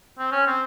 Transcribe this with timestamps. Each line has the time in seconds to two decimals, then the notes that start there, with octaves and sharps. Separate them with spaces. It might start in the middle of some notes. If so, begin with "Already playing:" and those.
0.19 C4
0.32 C#4
0.47 C4